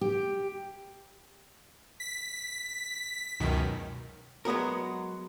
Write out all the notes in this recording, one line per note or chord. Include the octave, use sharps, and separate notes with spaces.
G4
B6
C#2 F#2 B2 D#3
F#3 G#3 B3 F#4 A#4